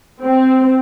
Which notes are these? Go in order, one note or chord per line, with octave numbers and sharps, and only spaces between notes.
C4